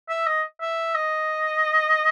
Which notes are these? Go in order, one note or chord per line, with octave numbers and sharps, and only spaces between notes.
E5
D#5
E5
D#5